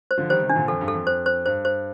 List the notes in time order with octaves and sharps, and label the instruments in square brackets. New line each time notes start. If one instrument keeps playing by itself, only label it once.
[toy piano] C5
[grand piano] D3 F3
[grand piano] D#3 G3 [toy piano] C5
[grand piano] C3 D#3
[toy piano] D4
[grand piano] A#2 D3
[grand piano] F2 [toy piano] A4
[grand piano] G2
[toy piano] A4
[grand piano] F2
[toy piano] C5
C5
[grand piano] G2 [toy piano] C5
[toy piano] C5